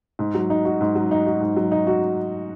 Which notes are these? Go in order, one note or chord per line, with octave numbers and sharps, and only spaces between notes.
G#2
F#3
D#4
F#4
G#2
F#3
D#4
F#4
G#2
F#3
D#4
F#4